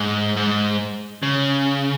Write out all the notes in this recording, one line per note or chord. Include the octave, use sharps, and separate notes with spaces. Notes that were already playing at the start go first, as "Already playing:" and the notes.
Already playing: G#2
G#2
C#3